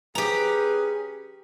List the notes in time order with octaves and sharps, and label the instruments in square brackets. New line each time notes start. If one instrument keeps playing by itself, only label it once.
[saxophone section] C#4 G#4 B4 [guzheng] G4 A#5